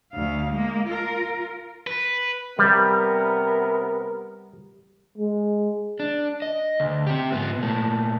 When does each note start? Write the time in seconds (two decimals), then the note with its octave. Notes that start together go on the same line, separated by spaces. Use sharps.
0.13 D2 F5
0.52 G#3 A#3
0.87 F4 A#4
1.87 B4
2.59 C3 G3 B3 A#4
5.18 G#3
6.00 D4
6.42 D#5
6.80 D2
7.07 C4 G4
7.32 G#2 B3
7.60 A#2 A3